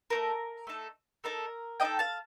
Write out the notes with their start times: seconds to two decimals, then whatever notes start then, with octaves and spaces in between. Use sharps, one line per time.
0.10 A3 D#4 A4 A#4
0.67 A3 D#4 A4
1.24 A3 D#4 A4 A#4
1.80 A3 D#4 A4 D#5 G5
1.99 F5 A5